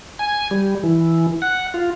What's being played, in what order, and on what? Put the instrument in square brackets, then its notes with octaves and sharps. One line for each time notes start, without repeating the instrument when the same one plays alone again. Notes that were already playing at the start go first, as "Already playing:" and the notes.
[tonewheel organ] G#5
G3
E3
F#5
F4